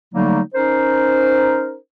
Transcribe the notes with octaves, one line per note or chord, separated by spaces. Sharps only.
D3 F#3 G3 A3 A#3 D#4
C#4 D#4 A#4 C5